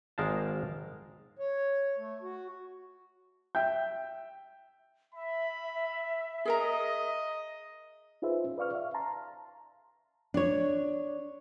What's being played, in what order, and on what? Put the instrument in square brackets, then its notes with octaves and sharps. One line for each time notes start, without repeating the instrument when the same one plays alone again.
[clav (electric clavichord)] G#1 G#3 A#4 F5 G5 A5
[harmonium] C#5
A3
F#4
[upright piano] E5 G5 G6
[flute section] E5 [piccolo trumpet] B5
[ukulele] G#4 A#4 A#5 [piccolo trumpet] D#5
[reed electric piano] D#4 F4 G#4 B4 C5 E5
C#4
B4 D5 F5 C#6 F6
E5 F5
A5 A#5 C6
[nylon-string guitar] D4 C#5